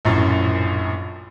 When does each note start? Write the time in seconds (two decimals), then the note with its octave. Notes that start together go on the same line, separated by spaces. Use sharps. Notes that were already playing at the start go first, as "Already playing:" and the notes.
0.05 A#1 F#2 A2